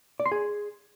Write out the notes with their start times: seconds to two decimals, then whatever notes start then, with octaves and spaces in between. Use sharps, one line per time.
0.20 D5
0.26 C6
0.32 G#4